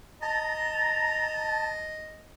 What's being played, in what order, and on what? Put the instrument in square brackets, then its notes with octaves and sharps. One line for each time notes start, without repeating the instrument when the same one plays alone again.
[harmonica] D#5 [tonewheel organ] A5 [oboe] A#5